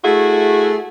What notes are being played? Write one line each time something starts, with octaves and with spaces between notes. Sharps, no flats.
A3 E4 F#4 G#4